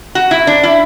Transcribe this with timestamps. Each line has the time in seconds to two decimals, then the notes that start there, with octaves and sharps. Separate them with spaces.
0.15 F#4
0.31 E4
0.47 D4
0.63 E4